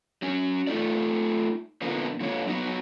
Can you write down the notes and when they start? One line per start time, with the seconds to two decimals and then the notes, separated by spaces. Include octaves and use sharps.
0.22 F#3 C#4
0.67 A3 D#4 F4 A4 D5
1.82 A#2 D3 F3 A#3 B3
2.20 D3 F3 A#3 C#5
2.47 F#3 B3 D#4 F#4